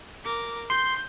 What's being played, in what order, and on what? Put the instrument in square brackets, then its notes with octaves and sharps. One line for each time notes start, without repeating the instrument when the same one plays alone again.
[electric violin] A#4 D6
[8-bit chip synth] C6 [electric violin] G6